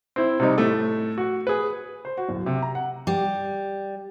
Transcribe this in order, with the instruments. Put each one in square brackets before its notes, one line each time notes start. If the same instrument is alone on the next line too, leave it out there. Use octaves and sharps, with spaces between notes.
[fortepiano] C4 E4
C3 G3 D#4
A2 A3
F#4
G#4 B4
[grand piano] C5
F#4
D1
C3
A#5
F#5
[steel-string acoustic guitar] G3